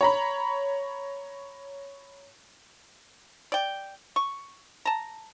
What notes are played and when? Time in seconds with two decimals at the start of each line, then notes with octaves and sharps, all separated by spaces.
0.01 C#5 A#5 B5
3.52 D5 G5
4.16 C#6
4.85 A5 A#5